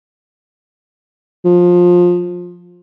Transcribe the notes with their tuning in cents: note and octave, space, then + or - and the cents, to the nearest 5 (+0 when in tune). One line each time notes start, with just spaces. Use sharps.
F3 +20